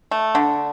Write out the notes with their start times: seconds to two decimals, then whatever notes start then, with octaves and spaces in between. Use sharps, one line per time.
0.11 A3
0.35 D3